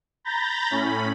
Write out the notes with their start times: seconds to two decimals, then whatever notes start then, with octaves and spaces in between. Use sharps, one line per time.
0.24 A#5 B5 G6 A6 A#6
0.71 A2 C#4 B5